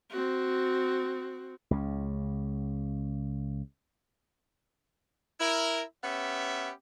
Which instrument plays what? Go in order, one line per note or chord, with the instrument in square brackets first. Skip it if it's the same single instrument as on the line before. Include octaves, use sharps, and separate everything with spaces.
[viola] C4 F#4
[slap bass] C#2 C#3
[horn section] E4 A#4
B3 C#4 G4 E5